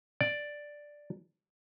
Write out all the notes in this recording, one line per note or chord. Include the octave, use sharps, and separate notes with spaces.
D5